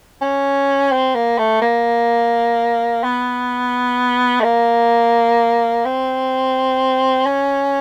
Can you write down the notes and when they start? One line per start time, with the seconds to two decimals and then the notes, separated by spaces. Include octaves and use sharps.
0.21 C#4
0.92 C4
1.15 A#3
1.38 A3
1.62 A#3
3.03 B3
4.40 A3
4.43 A#3
5.85 C4
7.26 C#4